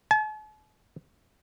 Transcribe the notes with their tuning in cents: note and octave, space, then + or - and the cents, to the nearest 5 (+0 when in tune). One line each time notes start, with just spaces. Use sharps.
A5 -45